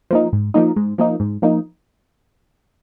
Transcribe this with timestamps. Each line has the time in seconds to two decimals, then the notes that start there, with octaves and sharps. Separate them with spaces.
0.11 F3 A#3 D#4
0.33 G#2
0.54 F3 A#3 D#4
0.76 G#2
0.98 F3 A#3 D#4
1.20 G#2
1.42 F3 A#3 D#4